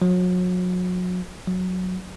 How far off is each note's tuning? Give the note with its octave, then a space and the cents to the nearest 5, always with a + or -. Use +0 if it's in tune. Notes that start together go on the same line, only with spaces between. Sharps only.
F#3 -35
F#3 -10